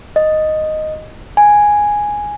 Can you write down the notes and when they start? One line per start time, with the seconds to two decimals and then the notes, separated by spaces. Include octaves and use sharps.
0.16 D#5
1.37 G#5